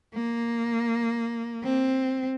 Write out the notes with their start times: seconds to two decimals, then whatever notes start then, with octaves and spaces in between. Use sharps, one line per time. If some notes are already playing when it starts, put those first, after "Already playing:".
0.15 A#3
1.64 C4